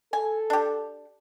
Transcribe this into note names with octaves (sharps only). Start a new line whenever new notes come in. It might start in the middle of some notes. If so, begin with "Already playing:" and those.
A4 G#5
D4 G4